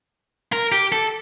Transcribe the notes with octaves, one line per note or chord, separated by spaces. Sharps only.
A#4
G4
A4